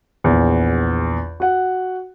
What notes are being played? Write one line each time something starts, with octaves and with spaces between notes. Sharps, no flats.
A#1 E2
F#4 F#5